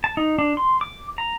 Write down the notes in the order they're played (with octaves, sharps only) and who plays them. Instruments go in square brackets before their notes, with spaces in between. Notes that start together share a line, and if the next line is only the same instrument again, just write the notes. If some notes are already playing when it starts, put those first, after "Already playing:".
[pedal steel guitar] A5
D#4
D4
C6
D6
A#5